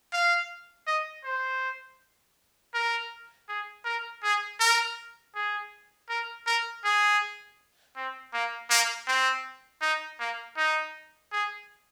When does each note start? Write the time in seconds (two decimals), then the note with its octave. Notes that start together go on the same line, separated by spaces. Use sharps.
0.13 F5
0.87 D#5
1.24 C5
2.74 A#4
3.49 G#4
3.85 A#4
4.23 G#4
4.60 A#4
5.35 G#4
6.09 A#4
6.47 A#4
6.85 G#4
7.96 C4
8.33 A#3
8.70 A#3
9.07 C4
9.82 D#4
10.20 A#3
10.57 D#4
11.32 G#4